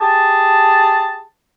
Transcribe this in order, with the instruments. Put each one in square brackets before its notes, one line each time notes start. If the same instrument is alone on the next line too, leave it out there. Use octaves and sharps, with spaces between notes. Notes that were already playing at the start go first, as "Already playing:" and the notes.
[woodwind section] G4 G#4 A5